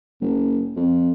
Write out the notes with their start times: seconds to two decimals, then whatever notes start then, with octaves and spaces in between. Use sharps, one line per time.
0.21 F#1
0.76 F2